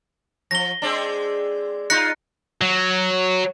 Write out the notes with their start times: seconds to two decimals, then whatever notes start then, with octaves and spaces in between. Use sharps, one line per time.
0.51 F3 A#6 G7
0.82 G#3 C4 D4
1.90 D#4 F4 F#6 A#6 C#7
2.62 F#3